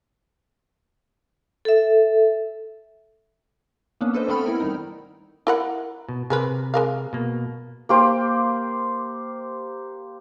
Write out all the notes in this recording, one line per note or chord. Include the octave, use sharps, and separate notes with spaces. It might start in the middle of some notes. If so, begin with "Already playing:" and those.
A4 E5
A#3 B3 C#4 D4
D4 A4 B4 C5 D#5
A3 B3 C4 A4 B5 F6
E4 A#4
D#3 G3 D#4
E4 A#4 F#5
B2
C3 G#4 A#4 B4
G#3 A#4 F5
B2 A#3
A#3 G4 C5